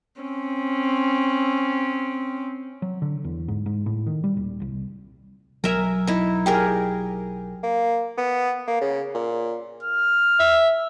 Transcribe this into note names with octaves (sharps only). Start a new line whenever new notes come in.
C4 C#4
F#3
D3
E2
G#2
G#2
A2
D#3
G3
D#1
C2
B1 F#3 A#4 E5 G#5
D#4 E4
G4 G#4 A#4
A#3
B3
A#3
C#3
A#2
F6
E5